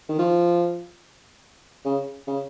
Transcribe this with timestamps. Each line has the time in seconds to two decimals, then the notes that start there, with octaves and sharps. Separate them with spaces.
0.09 D#3
0.19 F3
1.85 C#3
2.27 C#3